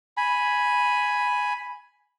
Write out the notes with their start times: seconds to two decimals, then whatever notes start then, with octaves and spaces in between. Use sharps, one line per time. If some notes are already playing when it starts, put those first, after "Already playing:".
0.17 G#5 B5